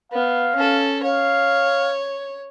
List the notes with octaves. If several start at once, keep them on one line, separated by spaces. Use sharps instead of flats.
B3 F5
C#4 A4
C#5 F5